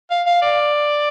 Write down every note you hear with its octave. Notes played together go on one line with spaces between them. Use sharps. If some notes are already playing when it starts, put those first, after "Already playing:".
F5
F5
D5